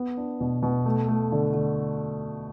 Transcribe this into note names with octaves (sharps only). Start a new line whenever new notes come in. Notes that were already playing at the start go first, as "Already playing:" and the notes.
Already playing: B3
D4
B2
B2
A3
A3
D3
D3